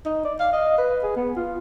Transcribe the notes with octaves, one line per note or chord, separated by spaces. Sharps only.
D#4
D5
F5
D#5
B4
G#4
B3
F4